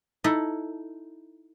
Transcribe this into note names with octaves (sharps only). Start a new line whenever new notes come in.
D#4 E4 A4